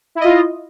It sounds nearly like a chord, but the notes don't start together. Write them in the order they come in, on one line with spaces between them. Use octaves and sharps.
E4 D#5 F4